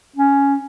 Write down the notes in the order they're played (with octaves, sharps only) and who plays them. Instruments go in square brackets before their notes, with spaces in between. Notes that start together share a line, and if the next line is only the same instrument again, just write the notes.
[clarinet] C#4